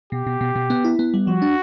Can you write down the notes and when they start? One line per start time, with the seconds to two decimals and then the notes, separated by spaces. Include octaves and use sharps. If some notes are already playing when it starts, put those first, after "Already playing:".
0.12 B2 G4
0.27 B2
0.41 B2
0.56 B2
0.70 B3
0.84 E4
0.99 B3
1.14 G3
1.27 F3 F#4
1.42 D4